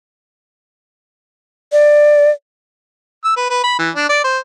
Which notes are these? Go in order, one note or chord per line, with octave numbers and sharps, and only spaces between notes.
D5
E6
B4
B4
B5
E3
D4
D5
C5